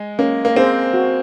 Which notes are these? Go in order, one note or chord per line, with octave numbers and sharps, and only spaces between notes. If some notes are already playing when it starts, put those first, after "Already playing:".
Already playing: G#3
A#3 C#4
A#3
C4 G#4 C5
F#4